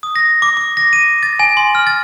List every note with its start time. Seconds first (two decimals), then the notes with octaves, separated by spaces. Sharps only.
0.03 D#6
0.16 A#6
0.42 D6
0.57 D6
0.77 A#6
0.93 D#7
1.23 A6
1.39 G#5
1.57 C6
1.75 F6
1.87 A6